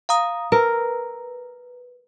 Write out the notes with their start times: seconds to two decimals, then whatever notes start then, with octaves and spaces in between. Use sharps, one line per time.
0.09 F5 A#5 D#6
0.52 A#4 B4